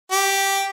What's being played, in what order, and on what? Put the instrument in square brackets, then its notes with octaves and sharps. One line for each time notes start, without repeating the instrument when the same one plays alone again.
[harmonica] G4